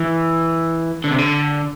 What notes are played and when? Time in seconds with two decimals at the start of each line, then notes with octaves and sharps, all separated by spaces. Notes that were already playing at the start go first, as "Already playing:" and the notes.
Already playing: E3
1.04 D3
1.11 C3
1.18 D3